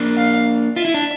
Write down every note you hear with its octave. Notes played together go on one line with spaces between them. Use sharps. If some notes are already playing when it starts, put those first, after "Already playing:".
Already playing: A#3 D4
F5
F4 E5
E4
D4